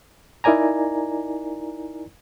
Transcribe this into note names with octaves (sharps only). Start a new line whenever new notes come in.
D#4 E4 A#4 D5 G#5 A#5